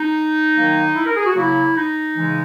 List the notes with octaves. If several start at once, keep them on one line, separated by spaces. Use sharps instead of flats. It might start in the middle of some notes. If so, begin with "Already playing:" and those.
Already playing: D#4
D#3 F#3 A#3
E4
A#4
G#4
F#4
C#3 F#3 A#3 E4
D#4
C#3 E3 G#3